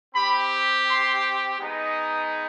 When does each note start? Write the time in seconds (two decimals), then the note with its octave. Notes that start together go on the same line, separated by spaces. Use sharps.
0.15 C4 G4 B5
0.88 C6
1.59 G#3 B3 D#4